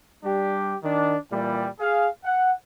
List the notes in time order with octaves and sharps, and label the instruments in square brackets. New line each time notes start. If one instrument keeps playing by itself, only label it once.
[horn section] G3 D4 G4
D#3 D4
A#2 E3 G3
G#4 F5
F#5